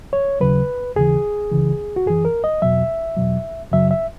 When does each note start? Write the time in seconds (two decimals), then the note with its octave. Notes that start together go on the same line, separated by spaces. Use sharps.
0.13 C#5
0.40 D#2 C#3 F#3 B4
0.96 D#2 C#3 E3 G#4
1.52 C#2 C#3 E3
1.96 F#4
2.06 F#2 E3 G#4
2.25 A#4
2.44 D#5
2.62 E2 B2 F#3 E5
3.17 E2 B2 F#3
3.72 F#2 C#3 F#3 E5
3.91 E5